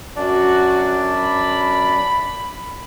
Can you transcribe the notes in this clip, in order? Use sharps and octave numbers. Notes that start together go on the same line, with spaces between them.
F#2 D4 F#4 D5
B5